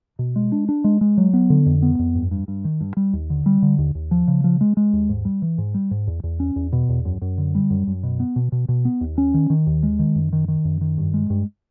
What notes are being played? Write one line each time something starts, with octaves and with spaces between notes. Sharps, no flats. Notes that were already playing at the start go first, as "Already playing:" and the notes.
B2
G#3
D4
D4
G#3
G#3
F#3
B3
D3
F2
B3
F2
G2
G2
G2
D#3
G2
G3
D#2
D3
G3
D3
D#2
D#2
F3
C#3
F3
G#3
G#3
D#2
G#2
G3
E3
G#2
G3
G#2
E2
E2
C#4
E2
B2
E2
F#2
F#2
D3
G3
F#2
F#2
B2
B3
B2
B2
B2
B3
D#2
C#4
D#3
D#3
D#2
G#3
D#3
F#2
D#3
D#3
F#2
D#3
G2
G#3
G2